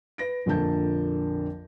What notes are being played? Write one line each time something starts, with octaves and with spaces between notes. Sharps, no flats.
B4 A#6 D7
A#1 F2 D3 A#4 A5 G6